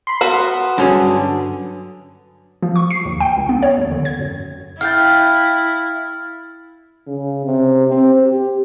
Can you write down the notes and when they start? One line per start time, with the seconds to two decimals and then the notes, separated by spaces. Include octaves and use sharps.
0.07 B5 C6
0.21 B3 F#4 F#5
0.78 G2 D3 F#3 C#4 G#4
2.62 F3
2.76 C#6
2.91 C7
3.05 D#2
3.20 G5
3.37 C#2
3.49 B3
3.63 C#5
3.77 D#2
3.91 D3
4.05 G#6
4.19 F#2
4.81 E4 F5 G5 F6 G6 A6
7.07 C#3
7.45 C3
7.88 C4
8.26 G4